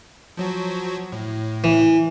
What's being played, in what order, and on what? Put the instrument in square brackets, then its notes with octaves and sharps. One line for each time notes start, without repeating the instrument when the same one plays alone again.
[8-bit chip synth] F3 F#3 F#4
A2
[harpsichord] E3